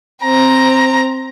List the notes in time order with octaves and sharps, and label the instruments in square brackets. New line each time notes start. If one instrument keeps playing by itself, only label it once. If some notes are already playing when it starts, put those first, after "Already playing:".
[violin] C4 A#5